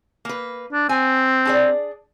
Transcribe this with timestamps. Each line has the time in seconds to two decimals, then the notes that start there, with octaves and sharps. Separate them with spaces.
0.25 A#3 B4
0.73 D4
0.89 C4 G#5
1.45 D4 G#4 D5